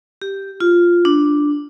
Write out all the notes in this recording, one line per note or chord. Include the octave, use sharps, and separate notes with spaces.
G4
F4
D4